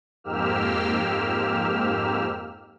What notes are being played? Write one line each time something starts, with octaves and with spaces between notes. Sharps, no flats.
F2 G#2 A#3 G4 E6 F6